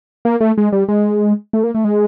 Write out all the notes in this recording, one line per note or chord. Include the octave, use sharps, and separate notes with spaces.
A#3
A3
G#3
G3
G#3
A3
A#3
A3
G#3